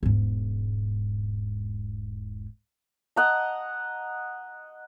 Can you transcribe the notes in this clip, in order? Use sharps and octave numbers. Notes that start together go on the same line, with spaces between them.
E1 G#2
D#5 F#5 A#5